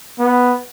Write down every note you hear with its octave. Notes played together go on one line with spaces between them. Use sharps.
B3